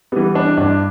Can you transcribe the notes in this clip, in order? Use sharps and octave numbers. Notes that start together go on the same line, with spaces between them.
E3 G3 B3
D4
G2 D4